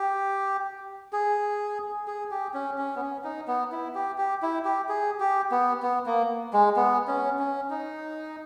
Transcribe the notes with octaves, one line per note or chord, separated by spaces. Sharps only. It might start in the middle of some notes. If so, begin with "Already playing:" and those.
Already playing: G4
G#4
G#4
G4
C#4
C#4
B3
C#4
D#4
B3
E4
G4
G4
E4
G4
G#4
G4
B3
B3
A#3
G#3
B3
C#4
C#4
D#4